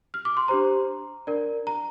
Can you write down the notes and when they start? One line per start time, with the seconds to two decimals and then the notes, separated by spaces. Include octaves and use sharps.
0.14 F6
0.25 D6
0.37 C6
0.48 D4 G4 C5 A#5
1.27 D4 A#4 D5
1.67 A#5